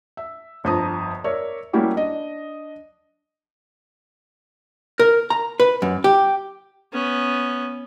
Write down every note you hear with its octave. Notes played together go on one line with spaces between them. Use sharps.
E5
G1 F2 C5 A5 A#5 D#6
A#4 C#5 D5 E5
G3 A#3 C#4 E4 F#4 G4
D4 D#5
A#4
A#5
B4
F#2
G4
B3 C#4